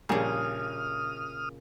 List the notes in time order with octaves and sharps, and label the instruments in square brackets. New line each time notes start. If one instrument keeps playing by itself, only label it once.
[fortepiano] A#1 G3 G#4 [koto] A#2 C#3 [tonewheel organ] D#6 F6